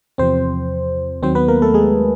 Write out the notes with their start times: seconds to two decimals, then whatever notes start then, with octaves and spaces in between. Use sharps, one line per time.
0.18 E2 C3 F3 C4 C5
1.22 D#2 D#3 F#3 C4 C5
1.35 B3 B4
1.48 A#3 A#4
1.62 A3 A4
1.74 G#3 G#4